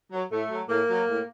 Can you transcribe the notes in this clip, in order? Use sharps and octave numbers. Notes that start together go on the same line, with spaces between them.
F#3
A2 A3
F#3
A2 A#3
F#3
A2